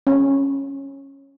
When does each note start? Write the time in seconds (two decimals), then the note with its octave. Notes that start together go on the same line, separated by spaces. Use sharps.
0.07 C#4